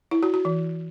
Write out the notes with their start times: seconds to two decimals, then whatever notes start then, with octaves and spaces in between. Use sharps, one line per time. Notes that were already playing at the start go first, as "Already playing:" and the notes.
0.11 E4
0.23 F#4
0.34 F#4
0.45 E3